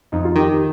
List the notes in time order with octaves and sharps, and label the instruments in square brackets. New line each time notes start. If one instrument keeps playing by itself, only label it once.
[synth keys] F2 [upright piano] D#4
[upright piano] F4
[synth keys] D#3 [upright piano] G4
[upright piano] G4